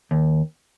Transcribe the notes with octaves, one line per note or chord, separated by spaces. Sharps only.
D#2